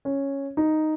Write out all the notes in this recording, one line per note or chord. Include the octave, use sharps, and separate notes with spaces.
C#4
D#4